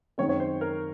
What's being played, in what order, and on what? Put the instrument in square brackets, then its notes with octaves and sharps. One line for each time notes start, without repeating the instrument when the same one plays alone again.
[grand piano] F#2 D#3 G#3 C4 [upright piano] C#5
[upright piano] C#5
C5
A#4